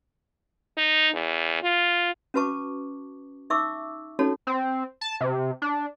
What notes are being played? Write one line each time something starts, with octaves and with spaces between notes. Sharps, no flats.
D#4
E2
F4
C#4 F#4 B4 A5 C#6 D6
D#4 E5 C#6 D6 E6
C#4 D#4 F#4 A4 C#5
C4
A5
C3
D4